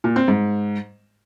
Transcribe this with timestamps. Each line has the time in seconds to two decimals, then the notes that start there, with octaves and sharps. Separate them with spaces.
0.04 A#2
0.16 C4
0.28 G#2